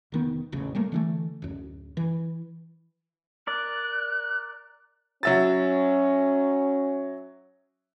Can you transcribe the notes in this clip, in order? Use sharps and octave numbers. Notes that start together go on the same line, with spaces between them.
F1 D#3 B3
E1 A1 C#3
G3 A3 A#3
D3 E3 A3
D1 F#2
E3
A#4 D5 F#6
F#3 C#4 E5 A6